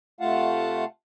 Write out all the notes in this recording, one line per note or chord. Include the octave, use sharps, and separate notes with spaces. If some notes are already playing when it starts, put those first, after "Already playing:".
C3 A3 F4 F5 F#5 A5